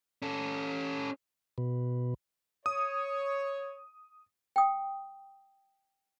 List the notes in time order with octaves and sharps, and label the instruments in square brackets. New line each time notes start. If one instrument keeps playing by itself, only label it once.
[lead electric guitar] C#4 A4
[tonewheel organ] B2
[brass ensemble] C#5 [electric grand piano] D#6
[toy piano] G5 D#6